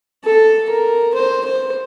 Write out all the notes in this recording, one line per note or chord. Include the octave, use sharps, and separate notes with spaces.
A4
A#4
C5
C5